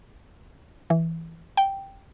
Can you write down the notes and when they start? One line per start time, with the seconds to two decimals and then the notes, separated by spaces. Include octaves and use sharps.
0.90 E3
1.57 G5